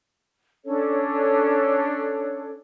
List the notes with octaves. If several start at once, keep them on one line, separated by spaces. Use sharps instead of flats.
C#4 D4 A4 C#5